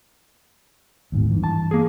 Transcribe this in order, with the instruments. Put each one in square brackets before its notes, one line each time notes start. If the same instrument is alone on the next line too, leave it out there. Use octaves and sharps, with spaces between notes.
[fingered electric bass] D#2 G#2 B2
G2 E3
[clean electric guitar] A5
A#3 G#4